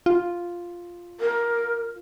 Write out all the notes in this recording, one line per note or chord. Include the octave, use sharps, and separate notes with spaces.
F4
A#4